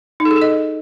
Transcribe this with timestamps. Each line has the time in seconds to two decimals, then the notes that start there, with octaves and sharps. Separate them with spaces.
0.20 D#4
0.25 A4
0.31 G#4
0.36 A4
0.42 D#5